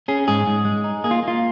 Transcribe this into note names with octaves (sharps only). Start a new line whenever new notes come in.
C#4 G#4
G#2 G#4
G#2
G#3
D#4
A#3 G#4
F4
A#3
F4